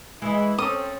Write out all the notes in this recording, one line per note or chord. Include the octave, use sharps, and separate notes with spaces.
E3 G#3 E4 D#5
C4 C#4 A4 C5 D#6